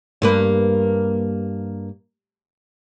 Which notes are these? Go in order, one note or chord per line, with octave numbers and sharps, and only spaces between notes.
G2 A#3 B4